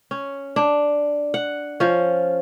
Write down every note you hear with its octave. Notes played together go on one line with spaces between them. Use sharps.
C#4
D4
F#5
F3 C#4